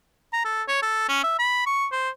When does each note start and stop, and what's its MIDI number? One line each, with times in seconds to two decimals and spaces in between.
0.33 0.42 82
0.45 0.63 69
0.68 0.81 73
0.82 1.04 69
1.09 1.20 61
1.23 1.35 76
1.39 1.63 83
1.66 1.87 85
1.92 2.10 72